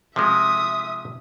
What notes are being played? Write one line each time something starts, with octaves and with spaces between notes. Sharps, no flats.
C3 F3 G#3 E5 D#6